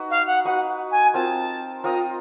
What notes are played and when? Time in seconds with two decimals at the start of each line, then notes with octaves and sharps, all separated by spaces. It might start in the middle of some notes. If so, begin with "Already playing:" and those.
Already playing: D#4 F#4 B4
0.10 F5
0.27 F#5
0.45 D#4 F#4 B4 F#5
0.91 G#5
1.14 C4 F4 A#4 D#5 A5
1.83 C4 F4 A#4 D#5 A#5